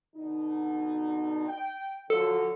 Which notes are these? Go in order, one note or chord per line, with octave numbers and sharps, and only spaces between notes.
B2 D3 D#4
G5
D3 F3 F#3 A4